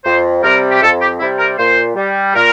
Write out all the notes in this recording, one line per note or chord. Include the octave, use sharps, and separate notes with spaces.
F2 C5
C3 G3 A#4
G4
F2 A4
G4
C3 G3 E4
A#4
A#2 C5
G3
A#2 A#4